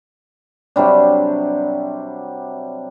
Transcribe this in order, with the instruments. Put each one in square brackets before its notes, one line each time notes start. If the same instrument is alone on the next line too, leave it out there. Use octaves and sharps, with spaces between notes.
[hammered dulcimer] C3 F#3 G3 D4